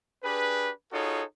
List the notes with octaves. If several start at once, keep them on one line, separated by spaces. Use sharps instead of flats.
D4 G4 G#4 B4
D#4 F4 F#4 G#4 A4 C#5